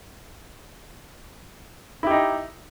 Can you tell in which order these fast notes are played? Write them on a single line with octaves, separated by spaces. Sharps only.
E4 G4 D#4